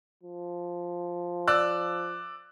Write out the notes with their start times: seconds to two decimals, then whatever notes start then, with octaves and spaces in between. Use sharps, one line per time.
0.23 F3
1.47 D5 E6 F#6